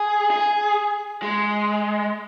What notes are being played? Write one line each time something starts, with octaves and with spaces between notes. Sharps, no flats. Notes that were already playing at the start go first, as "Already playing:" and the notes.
Already playing: G#4
G#4
G#3